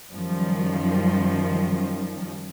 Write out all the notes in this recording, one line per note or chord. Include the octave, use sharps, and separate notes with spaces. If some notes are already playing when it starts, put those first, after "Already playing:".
F#2 D#3 F3 G3